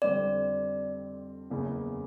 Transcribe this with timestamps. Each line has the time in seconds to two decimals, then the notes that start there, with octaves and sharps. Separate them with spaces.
0.02 F2 D3 G3 C4 D5
1.51 F#1 E2 C#3